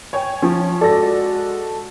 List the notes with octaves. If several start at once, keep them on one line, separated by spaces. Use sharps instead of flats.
C#5 G5 G#5
F3 C#4
G#3 F#4 A4 D5 A#6